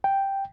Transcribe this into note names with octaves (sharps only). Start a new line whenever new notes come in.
G5